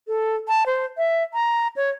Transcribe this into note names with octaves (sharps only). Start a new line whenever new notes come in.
A4
A5
C5
E5
A#5
C#5